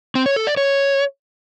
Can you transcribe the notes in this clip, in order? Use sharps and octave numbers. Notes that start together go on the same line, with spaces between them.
C4
C#5
A4
D5
C#5